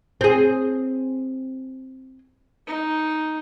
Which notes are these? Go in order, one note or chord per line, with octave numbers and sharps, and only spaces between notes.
C4 G#4
D#4